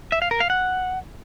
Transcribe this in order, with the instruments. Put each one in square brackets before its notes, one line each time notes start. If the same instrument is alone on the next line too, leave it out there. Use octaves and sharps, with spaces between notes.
[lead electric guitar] E5
F5
A#4
F5
F#5